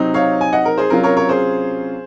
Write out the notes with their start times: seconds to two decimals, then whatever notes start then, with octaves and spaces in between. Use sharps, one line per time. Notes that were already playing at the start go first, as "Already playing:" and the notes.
Already playing: C3 F#3 C4 D#4
0.14 C#5 F5
0.41 G#5
0.53 D#5 F#5
0.66 A#4
0.78 G#4 C5
0.90 C3 F#3 C#4 F4 A#4
1.03 A#4 C#5
1.17 A#4 C#5
1.29 G#4 C5